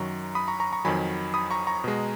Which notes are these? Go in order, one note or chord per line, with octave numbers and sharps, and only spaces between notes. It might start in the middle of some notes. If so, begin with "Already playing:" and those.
Already playing: F#2 D#3 F#3 A#5 C#6
B5 D#6
A#5 C#6
A#5 C#6
A#5 C#6
F2 D#3 F#3 G#5 B5
B5 D#6
A#5 C#6
A#5 C#6
B2 G#3